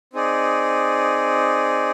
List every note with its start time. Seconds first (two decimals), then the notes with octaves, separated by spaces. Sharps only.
0.13 C4 D#4 G#4 D5